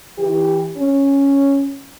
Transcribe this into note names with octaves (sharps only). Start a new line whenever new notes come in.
E3 G4
C#4